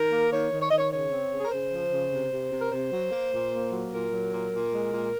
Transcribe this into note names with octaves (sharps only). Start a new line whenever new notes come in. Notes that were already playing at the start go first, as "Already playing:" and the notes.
Already playing: D#3 A#4
A#3
D#3 C#5
D#3
C#5
D#3 D#5
C#5
C#3 C#5
C4
C#3
G#4
A#4
C#3 C5
F3
C#3
C3
C3
C3
A#4
C3 C5
F#3
A#3
A#2
A#3
F#3
A#2 A#4
F#3
A#2
A#2
G#3
A#2